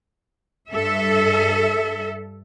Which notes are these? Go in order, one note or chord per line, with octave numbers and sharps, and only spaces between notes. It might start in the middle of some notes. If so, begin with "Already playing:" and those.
G2 A4 E5